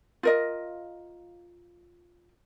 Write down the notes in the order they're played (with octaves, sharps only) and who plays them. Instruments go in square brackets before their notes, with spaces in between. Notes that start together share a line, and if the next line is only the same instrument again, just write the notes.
[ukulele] F4 A#4 D#5